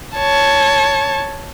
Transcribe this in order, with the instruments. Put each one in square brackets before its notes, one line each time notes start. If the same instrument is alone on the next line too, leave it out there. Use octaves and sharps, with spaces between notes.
[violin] C#5 A5